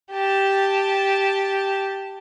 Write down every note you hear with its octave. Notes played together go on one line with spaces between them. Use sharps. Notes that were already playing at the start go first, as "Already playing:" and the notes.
G4 A5